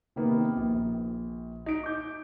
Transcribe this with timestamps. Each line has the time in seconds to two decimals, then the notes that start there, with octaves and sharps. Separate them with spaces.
0.16 C3 D#3 A#3 B3
0.56 A#1
1.66 D#4 D7
1.83 D6 G6